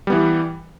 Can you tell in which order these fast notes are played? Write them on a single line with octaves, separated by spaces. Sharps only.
G3 B3 E3